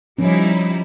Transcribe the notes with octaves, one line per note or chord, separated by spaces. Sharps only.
F3 G3 C#4 D#4 E4